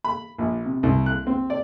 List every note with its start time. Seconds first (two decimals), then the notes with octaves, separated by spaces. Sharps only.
0.04 B5
0.38 A#1
0.66 C3
0.83 C2
1.06 F#6
1.27 C4
1.50 D5